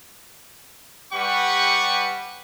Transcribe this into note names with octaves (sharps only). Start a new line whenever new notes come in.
G3 G4 B4 F#5 C#6